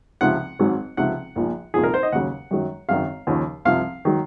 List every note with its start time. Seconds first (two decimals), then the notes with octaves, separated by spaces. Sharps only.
0.21 C#2 C3 F3 F#5
0.59 G#1 G#2 F#3
0.97 C#2 C3 F3 F#5
1.36 A#1 A#2 F3
1.74 C2 A#2 F3 G#4
1.83 A#4
1.94 C5
2.03 D#5
2.12 D#2 C#3 F#3 F#5
2.51 F#2 D#3 F#3
2.88 G#1 F#2 D#3 F5
3.27 D#2 C#3 F3
3.65 C2 C3 F3 F5
4.05 D#3 F#3